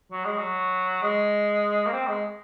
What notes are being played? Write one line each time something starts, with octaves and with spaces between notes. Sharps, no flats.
F#3
G#3
F#3
G#3
A#3
C4
G#3